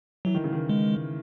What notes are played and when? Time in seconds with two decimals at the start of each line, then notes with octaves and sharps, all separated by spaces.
0.25 E3 F#3
0.35 D#3
0.44 C#3
0.53 D#3
0.69 G#3